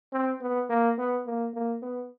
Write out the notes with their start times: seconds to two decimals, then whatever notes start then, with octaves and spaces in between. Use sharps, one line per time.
0.13 C4
0.41 B3
0.70 A#3
0.98 B3
1.26 A#3
1.54 A#3
1.83 B3